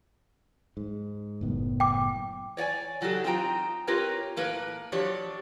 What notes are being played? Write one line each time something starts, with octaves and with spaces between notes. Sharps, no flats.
G#2
F#1 A2 B3
G5 D6
C#5 D5 F#5 G#5
C#3 F#3 F#4 G4 A4
C4 D#4 F4 C#5 G5 A#5
C4 F4 G4 A#4 B4 C#5
A2 A#3 A#4 B4
F3 F#3 D4 G4 C#5 D5